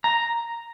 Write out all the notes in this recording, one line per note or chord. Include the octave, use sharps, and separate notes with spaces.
A#5